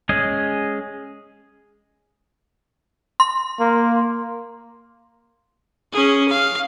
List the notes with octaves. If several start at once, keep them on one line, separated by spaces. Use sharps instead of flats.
G#3 C#4 G#4 D#5
C6
A#3
C#4 G#4
F5